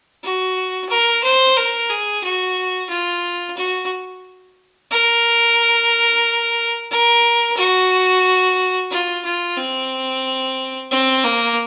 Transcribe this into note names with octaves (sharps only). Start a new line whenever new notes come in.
F#4
A#4
C5
A#4
G#4
F#4
F4
F#4
A#4
A#4
F#4
F4
F4
C4
C4
A#3